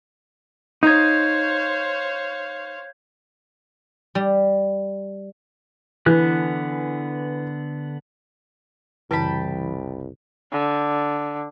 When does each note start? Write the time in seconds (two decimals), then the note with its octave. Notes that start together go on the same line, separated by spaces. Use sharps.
0.83 D#4 C5 C#5 F5 G6 G#6
4.15 G3
6.06 D3 E3 B3 F#6
9.11 C2 F#2 C#3 E3 G3 G5 A5 B5
10.52 D3